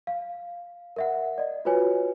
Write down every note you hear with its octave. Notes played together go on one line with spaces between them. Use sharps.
F5
A#4 E5 F#5
D5 D#5
F4 F#4 B4 C#5 G#5